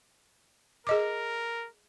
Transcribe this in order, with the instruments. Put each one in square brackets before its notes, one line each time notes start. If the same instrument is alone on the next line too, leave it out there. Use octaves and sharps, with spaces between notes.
[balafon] G#4 D#5 D6 [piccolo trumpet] A#4